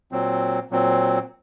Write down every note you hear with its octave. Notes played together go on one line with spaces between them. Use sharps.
A#2 F#3 C4
A#2 F#3 C4